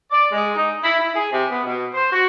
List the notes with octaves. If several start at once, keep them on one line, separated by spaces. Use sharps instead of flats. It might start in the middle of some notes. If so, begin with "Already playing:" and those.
D5
G#3
D#4
E4
E4
G#4
C3
B3
B2
C5
F#4